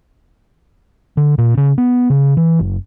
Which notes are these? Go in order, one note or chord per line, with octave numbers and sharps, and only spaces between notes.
D3
A#2
C#3
B3
C#3
E3
F#1